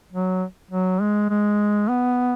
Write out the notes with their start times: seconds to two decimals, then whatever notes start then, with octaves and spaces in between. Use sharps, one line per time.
0.13 F#3
0.71 F#3
1.01 G#3
1.29 G#3
1.88 B3